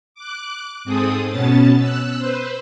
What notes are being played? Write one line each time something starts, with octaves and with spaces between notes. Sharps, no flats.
D6 F#6
G#2 C4 G#4 A4 D#6
B2 B3 C#4 A5 A6
E6 F#6
B4 C5